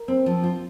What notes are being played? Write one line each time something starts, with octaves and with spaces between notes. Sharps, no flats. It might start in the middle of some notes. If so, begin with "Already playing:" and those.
Already playing: A#4
C4
F3
F4